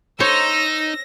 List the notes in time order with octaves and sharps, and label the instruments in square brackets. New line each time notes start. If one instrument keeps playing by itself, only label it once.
[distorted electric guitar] D#4 [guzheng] C5 C#5 [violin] E6 [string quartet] A#6